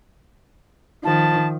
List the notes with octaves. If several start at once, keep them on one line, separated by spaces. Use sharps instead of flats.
D#3 F3 A5